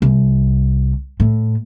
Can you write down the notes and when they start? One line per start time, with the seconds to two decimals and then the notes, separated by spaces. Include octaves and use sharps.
0.02 C2
1.20 A2